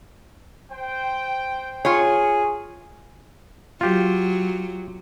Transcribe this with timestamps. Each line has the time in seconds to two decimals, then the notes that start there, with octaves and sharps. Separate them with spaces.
0.72 C5 G5
1.85 F4 G#4 C#5
3.81 F#3 F4 G4